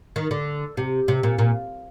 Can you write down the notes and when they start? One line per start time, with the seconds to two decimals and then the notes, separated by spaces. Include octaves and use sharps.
0.16 D#3
0.31 D3
0.77 C3
1.08 C3
1.23 A#2
1.38 A#2